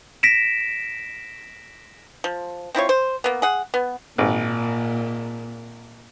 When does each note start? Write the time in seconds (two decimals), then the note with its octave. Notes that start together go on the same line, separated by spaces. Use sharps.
0.23 A#6 B6 D7 E7
2.24 F3
2.75 C4 E4 F4 C#5
2.89 C5
3.24 A#3 B3
3.42 G#4 F#5
3.74 B3
4.18 G#1 A#2